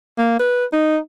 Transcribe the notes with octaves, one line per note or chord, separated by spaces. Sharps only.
A#3
B4
D#4